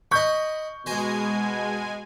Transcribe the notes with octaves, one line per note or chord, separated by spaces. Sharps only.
D#5 B5 C#6 G6
B2 G#3 C5 G#5 A#5